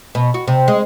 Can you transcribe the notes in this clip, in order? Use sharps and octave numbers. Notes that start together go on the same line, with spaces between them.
B2
F#4
C3
G#3